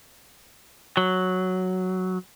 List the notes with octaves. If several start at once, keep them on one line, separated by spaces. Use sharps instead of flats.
F#3